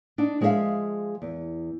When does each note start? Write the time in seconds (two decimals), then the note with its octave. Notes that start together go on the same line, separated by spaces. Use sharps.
0.18 D4 D#4
0.41 F3 G#3 G#4 C5 E5 F5
1.22 E2